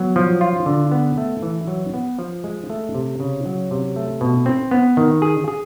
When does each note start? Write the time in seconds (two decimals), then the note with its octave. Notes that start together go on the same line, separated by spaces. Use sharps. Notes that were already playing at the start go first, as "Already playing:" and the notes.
Already playing: F#3 B3
0.16 F3
0.41 F4
0.66 D3
0.91 B3
1.17 A3
1.42 E3
1.67 F#3
1.94 B3
2.19 F3
2.44 G#3
2.70 A3
2.94 C3
3.20 C#3
3.46 F#3
3.71 C3
3.96 A3
4.21 B2
4.46 C4
4.71 B3
4.97 D#3
5.22 G#4
5.48 G#4